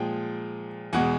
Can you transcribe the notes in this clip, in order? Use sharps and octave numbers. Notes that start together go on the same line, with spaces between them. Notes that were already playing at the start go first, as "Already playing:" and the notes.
Already playing: A#2 F3 G#3 G5
E2 B2 G#3 F#5 G#5